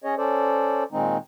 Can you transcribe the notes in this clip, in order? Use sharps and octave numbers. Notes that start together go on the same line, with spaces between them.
C#4 G#4 C#5 D#5
C#4 A4 C5 D5
A#2 D#3 G#3 C4 D#4